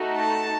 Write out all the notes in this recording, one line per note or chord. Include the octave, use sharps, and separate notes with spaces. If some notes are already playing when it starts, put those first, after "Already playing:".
Already playing: A3 D#4 F#4
A5